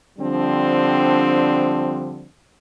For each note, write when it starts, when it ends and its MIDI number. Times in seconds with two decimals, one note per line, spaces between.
0.19 2.26 50
0.19 2.26 53
0.19 2.26 55
0.19 2.26 60
0.19 2.26 62